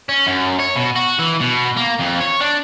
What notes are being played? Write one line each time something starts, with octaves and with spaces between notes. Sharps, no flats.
C#4
F#2
C#5
B2
F#4
E3
B2
A#3
F2
C#5
D4